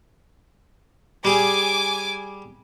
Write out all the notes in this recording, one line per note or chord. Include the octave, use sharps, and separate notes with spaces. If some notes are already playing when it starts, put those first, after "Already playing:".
G3 G#4 G#5 D6